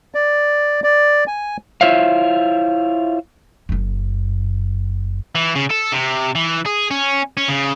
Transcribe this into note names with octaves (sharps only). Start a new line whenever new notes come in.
D5
D5
G#5
E4 F4 C5 C#5 E5 F5
F#1 F#2
E3
C#3
A4
C3
E3
G#4
C#4
C#4
C#3